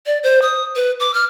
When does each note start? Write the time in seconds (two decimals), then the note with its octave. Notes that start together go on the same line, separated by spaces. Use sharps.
0.06 D5
0.23 C5
0.42 D#6
0.76 B4
1.00 D6
1.14 F6